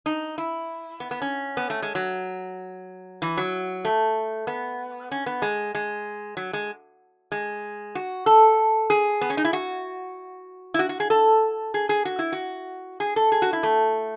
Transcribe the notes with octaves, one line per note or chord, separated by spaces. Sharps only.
D#4
E4
B3
B3
C#4
B3
A3
G#3
F#3
E3
F#3
A3
B3
C#4
B3
G#3
G#3
F#3
G#3
G#3
F#4
A4
G#4
B3
C#4
D#4
E4
F#4
E4
F#4
F#4
G#4
A4
G#4
G#4
F#4
E4
F#4
G#4
A4
G#4
F#4
E4
A3